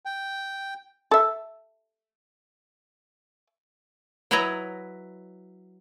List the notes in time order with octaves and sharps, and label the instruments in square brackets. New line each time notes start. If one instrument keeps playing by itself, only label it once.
[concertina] G5
[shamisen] A4 E5
[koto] F#3 E4 B4 C#5 D#5 A#5